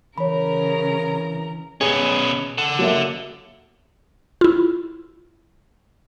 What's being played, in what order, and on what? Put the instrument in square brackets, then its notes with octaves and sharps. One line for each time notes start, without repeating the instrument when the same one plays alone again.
[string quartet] C#3 A#4 A#5 [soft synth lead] E3 [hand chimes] C#5 B5
[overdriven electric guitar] B2 C#4 [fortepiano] G#4
[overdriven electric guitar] A4 F#5
[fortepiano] F#3 A#3 E5
[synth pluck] E4 F4